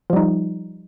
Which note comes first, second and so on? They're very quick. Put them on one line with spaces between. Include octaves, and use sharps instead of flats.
F3 G3 D#4